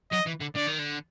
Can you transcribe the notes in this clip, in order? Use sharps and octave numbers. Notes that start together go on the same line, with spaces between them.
F#3 D#5
E3
D3
D3 D5
D#3
D3